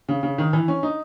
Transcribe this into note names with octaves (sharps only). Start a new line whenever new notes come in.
C#3
C#3
D#3
E3
C#4
D#4